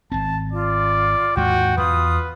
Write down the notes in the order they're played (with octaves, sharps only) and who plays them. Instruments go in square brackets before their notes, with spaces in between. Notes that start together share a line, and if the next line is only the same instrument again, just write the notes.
[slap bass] G#1 C4 [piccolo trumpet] A5
[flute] F4 [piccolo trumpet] D5
[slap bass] D#2 G#2 [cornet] F#4 [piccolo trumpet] G5
[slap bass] E2 [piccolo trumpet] F4 [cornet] B4 [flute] D#6